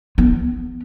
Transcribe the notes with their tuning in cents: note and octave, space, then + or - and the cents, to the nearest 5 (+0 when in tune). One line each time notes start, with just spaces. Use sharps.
B3 +0